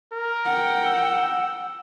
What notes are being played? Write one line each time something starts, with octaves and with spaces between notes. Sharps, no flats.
A#4
F#5 G5
E6